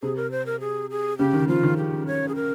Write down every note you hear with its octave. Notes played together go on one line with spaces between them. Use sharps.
C3 G#4
A#4
C5
A#4
G#4
G#4
C#3 G4
D#3
F3 F4
D#3
G4
C#5
G#4
A#4